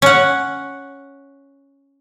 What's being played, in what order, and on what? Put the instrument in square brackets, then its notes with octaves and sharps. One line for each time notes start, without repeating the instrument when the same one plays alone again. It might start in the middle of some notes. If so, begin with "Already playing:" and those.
[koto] C#4 F#5